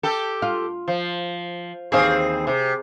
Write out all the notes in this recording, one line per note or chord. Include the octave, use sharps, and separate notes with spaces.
G4 A4
F4
F3
D#2 E3 C4 G#4 F5
C3